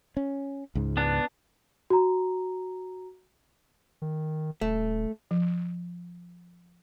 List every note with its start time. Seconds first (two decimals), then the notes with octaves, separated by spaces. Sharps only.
0.17 C#4
0.75 C#2 G#2
0.97 B3 D4
1.90 F#4 A#5
4.02 D#3
4.61 D#1 A3
5.31 F3